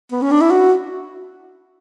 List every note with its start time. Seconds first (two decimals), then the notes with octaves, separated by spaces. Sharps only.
0.12 B3
0.22 C#4
0.31 D4
0.41 E4
0.51 F#4